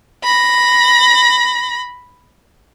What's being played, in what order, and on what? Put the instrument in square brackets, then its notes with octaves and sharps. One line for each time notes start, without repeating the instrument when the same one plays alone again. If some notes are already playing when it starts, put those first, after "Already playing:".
[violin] B5 A#6